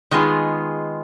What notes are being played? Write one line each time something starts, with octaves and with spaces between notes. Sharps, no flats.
D#3 G#3 B3 F4 G#4